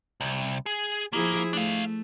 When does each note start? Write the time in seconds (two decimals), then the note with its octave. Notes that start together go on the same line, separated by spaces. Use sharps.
0.21 C2
0.66 G#4
1.13 F3 A#3 E4 G#4
1.53 A3 D4 F5